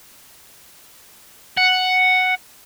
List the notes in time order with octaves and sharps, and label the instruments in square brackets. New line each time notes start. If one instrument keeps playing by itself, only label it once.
[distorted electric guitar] F#5